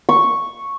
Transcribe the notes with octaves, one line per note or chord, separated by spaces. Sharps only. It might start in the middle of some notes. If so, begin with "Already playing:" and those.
C#6